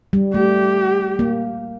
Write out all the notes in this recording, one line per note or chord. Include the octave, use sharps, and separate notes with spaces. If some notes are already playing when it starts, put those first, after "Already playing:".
G3
A3 G4
A#3